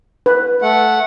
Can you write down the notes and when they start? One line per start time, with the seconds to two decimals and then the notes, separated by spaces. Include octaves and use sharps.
0.26 B4
0.62 A3 F#5